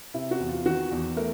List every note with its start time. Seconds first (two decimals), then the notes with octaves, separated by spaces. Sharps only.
0.14 C3 E4
0.31 F#4
0.40 E2
0.49 F4
0.65 D#3 F#4
0.91 E2
1.17 A3 A#4